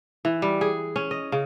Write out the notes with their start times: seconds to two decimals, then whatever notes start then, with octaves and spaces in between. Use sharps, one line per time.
0.25 E3
0.42 G3
0.61 G#4
0.96 C#4
1.11 D#5
1.32 C#3